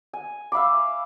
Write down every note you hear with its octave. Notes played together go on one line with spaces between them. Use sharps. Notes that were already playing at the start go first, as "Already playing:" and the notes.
G#5
E5 F5 B5 D6